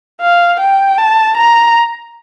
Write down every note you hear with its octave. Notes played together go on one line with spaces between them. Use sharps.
F5
G5
A5
A#5